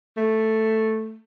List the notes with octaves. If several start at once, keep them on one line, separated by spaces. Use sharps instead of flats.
A3